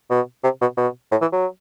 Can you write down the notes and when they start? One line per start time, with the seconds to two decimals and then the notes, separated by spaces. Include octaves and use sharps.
0.10 B2
0.44 C3
0.61 B2
0.77 B2
1.11 A2
1.22 E3
1.33 F#3